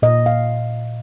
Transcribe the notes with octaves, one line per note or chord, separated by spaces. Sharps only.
A#2 D#5
F5